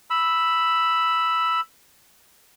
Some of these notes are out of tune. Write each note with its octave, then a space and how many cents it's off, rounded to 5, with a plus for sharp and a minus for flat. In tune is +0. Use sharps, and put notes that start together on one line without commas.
B5 +0 E6 +0